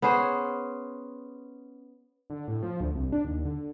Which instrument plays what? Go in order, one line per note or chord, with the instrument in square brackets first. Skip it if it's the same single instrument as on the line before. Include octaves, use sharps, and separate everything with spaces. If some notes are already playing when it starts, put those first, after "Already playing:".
[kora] B3 C#4 G#4 C5
[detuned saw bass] D3
A2
F3
D2
C2
D4
D#2
D3